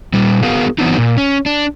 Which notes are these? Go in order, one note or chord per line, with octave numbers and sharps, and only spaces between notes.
A#2 G3
B3 F#4 G#4 A#4 F5
E3 F#3 B3 C4 D4 D#4
A#2
C#4
D4